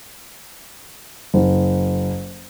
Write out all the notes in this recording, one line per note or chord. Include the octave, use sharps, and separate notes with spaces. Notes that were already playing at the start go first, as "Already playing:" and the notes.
F#1